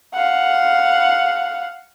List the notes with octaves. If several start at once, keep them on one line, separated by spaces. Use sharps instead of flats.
F5 F#5